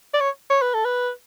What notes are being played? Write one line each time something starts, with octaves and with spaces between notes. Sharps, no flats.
D5
C#5
C#5
B4
A4
B4